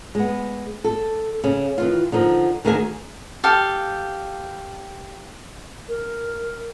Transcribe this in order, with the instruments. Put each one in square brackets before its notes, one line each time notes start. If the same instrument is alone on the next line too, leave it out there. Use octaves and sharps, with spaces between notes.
[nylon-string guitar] G#3 B3
A4
C#3
D#3 E3 F4
D3 F3 D#4 A#4
D2 D#3 G#4 A#4 E5 G#5
[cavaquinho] G4 A4 F5
[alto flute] A#4